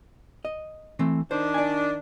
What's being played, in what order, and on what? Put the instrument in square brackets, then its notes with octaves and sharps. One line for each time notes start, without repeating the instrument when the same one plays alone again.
[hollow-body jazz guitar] D#5
E3 A3 C4
[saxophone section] D#3 D4 [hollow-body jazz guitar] C5
[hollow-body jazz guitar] D5 G#5